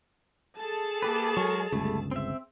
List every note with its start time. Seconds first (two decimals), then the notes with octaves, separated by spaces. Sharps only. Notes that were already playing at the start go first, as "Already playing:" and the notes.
0.57 G#4 A4 A5
1.02 A#3 G4 B4
1.37 F#3 G#3 A#4 C#6
1.72 G1 C#2 G3 A3
2.11 C4 E5